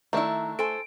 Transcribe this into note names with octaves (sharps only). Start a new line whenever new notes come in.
D#3 A3 D4 E4 A#5
A4 C5 G#5 D7